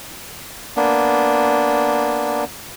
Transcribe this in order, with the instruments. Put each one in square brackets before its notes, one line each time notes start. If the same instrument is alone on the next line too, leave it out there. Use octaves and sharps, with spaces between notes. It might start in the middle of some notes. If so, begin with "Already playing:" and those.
[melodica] A#3 B3 D4